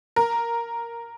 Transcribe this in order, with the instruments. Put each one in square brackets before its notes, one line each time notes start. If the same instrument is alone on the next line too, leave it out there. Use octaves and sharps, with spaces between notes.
[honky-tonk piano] A#4